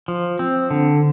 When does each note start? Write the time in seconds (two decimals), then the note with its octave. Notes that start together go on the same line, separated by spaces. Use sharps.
0.08 F3
0.39 C4
0.71 D3